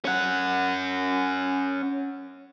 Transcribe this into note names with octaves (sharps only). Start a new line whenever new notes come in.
C#4 F#5